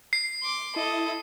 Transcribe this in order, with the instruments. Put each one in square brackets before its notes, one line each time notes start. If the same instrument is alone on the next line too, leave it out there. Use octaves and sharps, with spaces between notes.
[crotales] C7
[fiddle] C6 D6
[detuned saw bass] E4 [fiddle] A4 D#5